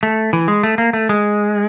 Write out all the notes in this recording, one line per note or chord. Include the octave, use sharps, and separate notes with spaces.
A3
E3
G#3
A3
A#3
A3
G#3